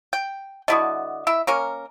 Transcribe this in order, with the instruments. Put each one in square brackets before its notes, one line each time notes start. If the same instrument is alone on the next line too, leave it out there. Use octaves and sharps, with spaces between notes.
[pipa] G5
[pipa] D3 E4 F#4 [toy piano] D#5 D#6
[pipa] E4 E5
[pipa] A#3 C#4 A#4 [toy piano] A#5